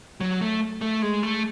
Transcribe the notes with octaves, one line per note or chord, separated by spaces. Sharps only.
F#3
A3
A3
G#3
A3